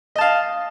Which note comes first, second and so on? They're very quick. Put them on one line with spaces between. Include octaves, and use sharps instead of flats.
D#5 A5 F5